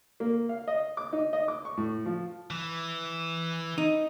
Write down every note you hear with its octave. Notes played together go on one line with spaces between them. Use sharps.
A#3
F5
D#5
D6
D#4
D#5
D6
C#6
A2
F3
E3
D#4